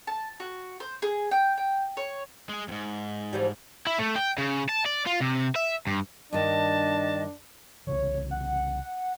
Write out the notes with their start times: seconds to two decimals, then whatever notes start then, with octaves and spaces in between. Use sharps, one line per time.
0.07 A5
0.40 F#4
0.80 C5
1.02 G#4
1.31 G5
1.58 G5
1.97 C#5
2.49 G#3 G#4
2.68 F2 G#2
3.33 E3 F3 G3
3.87 E4
3.99 A3
4.16 G5
4.38 C#3
4.69 A5
4.86 D5
5.07 F4
5.21 C3
5.56 E5
5.87 G2
6.33 G2 D#3 D4 D#5 A5
7.87 C2 C#3 E3 C#5
8.31 F#5